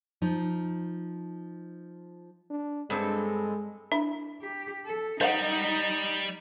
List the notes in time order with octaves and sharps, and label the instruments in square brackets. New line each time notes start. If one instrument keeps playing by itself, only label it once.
[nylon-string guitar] F3 D#4
[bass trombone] D4
[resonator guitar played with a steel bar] G2 C4 A4 [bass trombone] G#3
[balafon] D4 [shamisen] E4
[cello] G4
A4
[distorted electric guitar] G3 [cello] D#4 [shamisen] C5 F5 F#5 [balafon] D#5